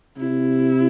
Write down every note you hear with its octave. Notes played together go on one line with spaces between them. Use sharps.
C3 E4